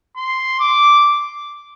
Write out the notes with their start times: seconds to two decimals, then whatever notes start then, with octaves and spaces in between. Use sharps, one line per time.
0.17 C6
0.60 D6